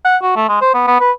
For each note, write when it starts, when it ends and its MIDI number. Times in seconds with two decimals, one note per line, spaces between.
0.05 0.17 78
0.22 0.33 66
0.36 0.44 57
0.49 0.59 56
0.61 0.73 72
0.74 0.83 59
0.87 0.99 59
1.00 1.11 71